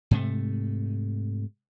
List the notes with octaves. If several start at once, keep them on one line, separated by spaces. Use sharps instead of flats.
G#2 C3 A3